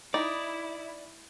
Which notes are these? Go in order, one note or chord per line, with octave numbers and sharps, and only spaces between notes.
D#4 E4 D5